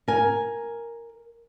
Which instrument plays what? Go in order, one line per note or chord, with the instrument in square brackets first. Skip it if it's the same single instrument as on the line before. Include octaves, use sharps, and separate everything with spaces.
[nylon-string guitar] A#4 G#5